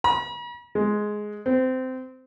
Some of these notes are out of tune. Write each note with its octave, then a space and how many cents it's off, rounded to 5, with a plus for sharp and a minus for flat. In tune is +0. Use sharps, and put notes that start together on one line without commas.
B5 -45
G#3 +10
C4 -20